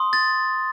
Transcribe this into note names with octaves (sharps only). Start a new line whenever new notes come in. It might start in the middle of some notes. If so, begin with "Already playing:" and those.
Already playing: C6 D#6
A6